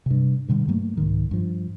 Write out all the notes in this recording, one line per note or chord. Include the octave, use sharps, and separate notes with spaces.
G2 C3
G2 B2 D3 G3
G2 F#3 A3 A#3
C2 G#2 D#3
G2 F3